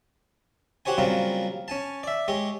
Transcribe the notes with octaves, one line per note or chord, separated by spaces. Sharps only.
F#4 G4 C5 C#5 G#5
C#3 F#3 G3 A#3 C4 F4
C#4 G#5 A5
D5 E5
G#3 G4 C#5